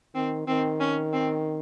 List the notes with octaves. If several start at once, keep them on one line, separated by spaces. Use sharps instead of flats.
D#3 C4
D#3 C4
C#4
C4